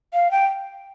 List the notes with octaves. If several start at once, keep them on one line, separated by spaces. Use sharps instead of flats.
F5
G5